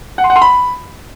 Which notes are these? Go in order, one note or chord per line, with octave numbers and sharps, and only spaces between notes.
F#5
C6
F#5
C6
B5